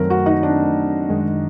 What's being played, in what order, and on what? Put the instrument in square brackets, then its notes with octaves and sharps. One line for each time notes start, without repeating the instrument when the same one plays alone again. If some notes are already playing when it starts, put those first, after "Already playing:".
Already playing: [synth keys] F#2 D#3 F#3 A3 C4 [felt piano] A#4
[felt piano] F#4
D#4
D4
[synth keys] F#2 D#3 G#3